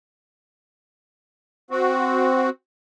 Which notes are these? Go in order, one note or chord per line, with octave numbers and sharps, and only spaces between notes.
C4 F#4